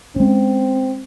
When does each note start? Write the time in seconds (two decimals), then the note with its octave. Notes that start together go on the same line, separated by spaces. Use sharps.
0.16 G#3 C4 C#4